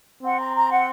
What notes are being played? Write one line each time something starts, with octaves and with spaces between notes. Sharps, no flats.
C4 F#5
A#5
A#5
F#5